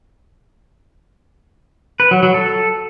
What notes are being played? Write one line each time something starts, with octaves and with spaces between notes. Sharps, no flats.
B4
F#3
F#3
A4